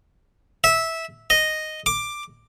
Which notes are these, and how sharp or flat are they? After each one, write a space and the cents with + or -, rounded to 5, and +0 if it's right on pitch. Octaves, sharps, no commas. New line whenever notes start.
E5 -15
D#5 -5
D6 +10